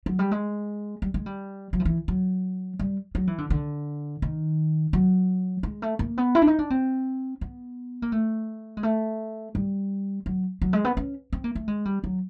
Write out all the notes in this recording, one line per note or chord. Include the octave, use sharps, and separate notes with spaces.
F#3
G3
G#3
G3
G#3
G3
F#3
F3
E3
F#3
G3
F#3
E3
D3
D3
D#3
F#3
G#3
A3
A#3
B3
E4
D4
D#4
D4
C4
B3
A#3
A3
G#3
A3
G3
F#3
F#3
G#3
B3
C#4
C4
A#3
A3
G#3
G3
F#3